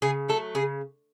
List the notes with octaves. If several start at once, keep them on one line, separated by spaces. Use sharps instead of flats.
C#3 G#4
F#3 A3 A4
C#3 G#4